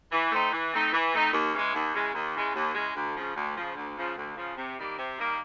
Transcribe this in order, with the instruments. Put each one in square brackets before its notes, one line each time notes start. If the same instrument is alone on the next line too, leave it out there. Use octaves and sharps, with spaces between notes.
[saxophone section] E3
A3 C4 D#4
E3
A3 C4 D#4
E3
A3 C4 D#4
D#2
C#3 E3 G#3
D#2
C#3 E3 G#3
D#2
C#3 E3 G#3
D#2
C#3 E3 G#3
D2
C#3 F3
D2
C#3 F3
D2
C#3 F3
D2
C#3 F3
C3
D#3 G3 A#3
C3
D#3 G3 A#3